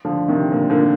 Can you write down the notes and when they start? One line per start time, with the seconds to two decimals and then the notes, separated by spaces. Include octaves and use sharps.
0.05 D3 F3
0.28 C3 D#3
0.52 A#2 D3
0.70 A#2 D3